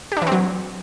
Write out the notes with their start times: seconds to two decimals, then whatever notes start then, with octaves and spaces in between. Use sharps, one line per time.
0.12 G4
0.17 D4
0.22 E3
0.27 C4
0.32 F#3